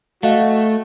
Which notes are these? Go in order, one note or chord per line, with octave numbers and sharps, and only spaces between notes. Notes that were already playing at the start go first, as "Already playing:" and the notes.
A3 F#4 D#5 F5